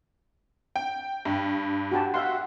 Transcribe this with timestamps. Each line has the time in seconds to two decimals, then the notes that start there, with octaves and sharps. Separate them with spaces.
0.76 G5
1.25 G2
1.92 F#4 G4 A5
2.14 F#4 E5 F5 C6